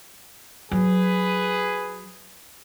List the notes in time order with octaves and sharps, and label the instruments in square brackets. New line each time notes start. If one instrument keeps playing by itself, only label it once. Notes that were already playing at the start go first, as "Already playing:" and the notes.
[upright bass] F#3 [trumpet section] G#4 B4